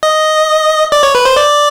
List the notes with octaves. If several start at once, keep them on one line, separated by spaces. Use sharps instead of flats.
D#5
D5
C#5
B4
C5
D5